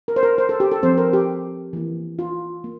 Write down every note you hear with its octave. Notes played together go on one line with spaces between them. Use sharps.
A#4
C5
A#4
C5
A4
G4
A4
F3 C4 C5
A#4
G4
E3 A#3
F4
A#3